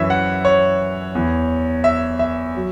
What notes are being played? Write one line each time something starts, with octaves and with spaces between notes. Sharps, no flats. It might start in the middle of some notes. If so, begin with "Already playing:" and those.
Already playing: F#2 E3 C#5 E5
F#5
C#5
E2 E3
E5
E5
F#3